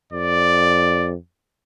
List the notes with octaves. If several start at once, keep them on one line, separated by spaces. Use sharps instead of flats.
F2 D5